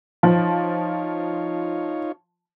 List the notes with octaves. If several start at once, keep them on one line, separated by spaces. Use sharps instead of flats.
F3 D#4 F4 C#5